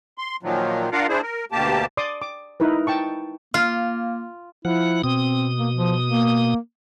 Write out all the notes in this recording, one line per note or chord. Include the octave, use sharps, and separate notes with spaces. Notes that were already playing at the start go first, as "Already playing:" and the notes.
C6
A#2 D#3 F3 F#3
D4 F4 A#4 F5 F#5
D4 E4 G#4 C5
A#4
D2 B2 A#3 G4 A5
D5 C6 D6 D#6
D6
D#4 E4 A#4 B4
G5 A5 C#6
A#3 F4 F6
F3 E4 F#5
B2 C4 D#6
A#3
F3
A#3